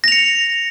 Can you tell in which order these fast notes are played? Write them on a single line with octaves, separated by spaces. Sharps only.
A#6 F7 C#7